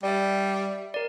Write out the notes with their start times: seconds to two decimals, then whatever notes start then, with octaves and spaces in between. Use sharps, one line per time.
0.03 G3 D5 E5
0.94 A#4 D5